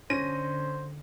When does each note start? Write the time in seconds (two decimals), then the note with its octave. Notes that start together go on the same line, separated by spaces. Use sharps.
0.10 D3 C#4 C5 A#6 D#7